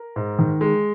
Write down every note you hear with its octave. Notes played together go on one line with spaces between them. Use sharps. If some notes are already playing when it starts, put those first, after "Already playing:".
Already playing: A#4
G#2
D#3
G#3